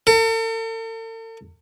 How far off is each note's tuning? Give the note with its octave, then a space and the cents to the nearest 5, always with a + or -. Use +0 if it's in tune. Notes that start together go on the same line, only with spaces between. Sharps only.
A4 +45